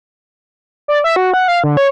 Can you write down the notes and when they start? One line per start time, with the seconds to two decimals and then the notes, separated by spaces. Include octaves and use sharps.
0.88 D5
1.04 E5
1.16 F#4
1.34 F#5
1.48 F5
1.64 D3
1.77 C#5